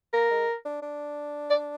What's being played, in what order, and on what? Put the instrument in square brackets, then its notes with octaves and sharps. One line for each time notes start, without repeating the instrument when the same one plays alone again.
[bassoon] A#3 [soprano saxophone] A#4
[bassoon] G#3
D4
D4
[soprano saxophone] D5